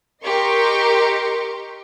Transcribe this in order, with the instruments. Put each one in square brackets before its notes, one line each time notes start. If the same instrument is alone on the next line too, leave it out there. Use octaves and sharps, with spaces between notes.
[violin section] G4 A#4 D#5 C6 C#6